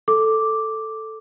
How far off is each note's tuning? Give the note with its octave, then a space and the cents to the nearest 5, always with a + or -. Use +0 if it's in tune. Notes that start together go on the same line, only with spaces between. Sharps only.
A4 +0 D6 +0